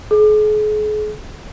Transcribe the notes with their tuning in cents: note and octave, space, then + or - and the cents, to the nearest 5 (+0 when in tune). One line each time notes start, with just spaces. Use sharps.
G#4 +40